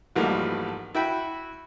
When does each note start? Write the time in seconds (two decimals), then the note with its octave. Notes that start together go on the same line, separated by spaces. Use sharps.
0.16 G#1 E2 F3 G3 A3 A#3
0.95 E4 F#4 G5 B5